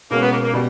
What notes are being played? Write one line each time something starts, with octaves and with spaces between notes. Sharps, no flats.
B2 G#3 A#3 C#4
B3
A#3
A#3
B2 G3